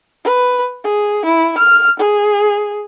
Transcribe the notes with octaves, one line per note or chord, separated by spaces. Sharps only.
B4
G#4
E4
F6
G#4